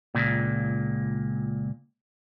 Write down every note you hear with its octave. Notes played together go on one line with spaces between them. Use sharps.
C#2 A#2